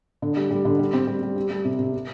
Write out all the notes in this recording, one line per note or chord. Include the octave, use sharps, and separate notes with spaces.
D3
G3
G3
D3
G3
C4
G3
G3
G3
G3
C3
C3
C3